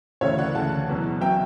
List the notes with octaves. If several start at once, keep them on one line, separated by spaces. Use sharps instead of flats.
D2 C#3 E3 C#5 E5
D5 F#5
D2 C#3 E3 F#5 A5
E2 B2 F#3
B2 F#3 E5 G5